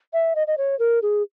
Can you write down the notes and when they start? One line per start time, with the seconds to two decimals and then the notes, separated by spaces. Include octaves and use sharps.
0.13 E5
0.35 D#5
0.47 D#5
0.58 C#5
0.79 A#4
1.02 G#4